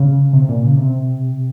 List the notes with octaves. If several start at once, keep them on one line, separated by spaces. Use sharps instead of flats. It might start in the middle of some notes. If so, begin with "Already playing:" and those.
Already playing: C#3
C3
A#2
C#3
C3